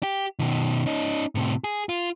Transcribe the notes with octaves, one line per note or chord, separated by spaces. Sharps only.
G4
B2 D#3
C#4 D#4
A2 C3
G#4
F4